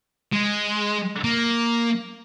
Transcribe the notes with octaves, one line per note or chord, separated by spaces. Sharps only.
G#3
A#3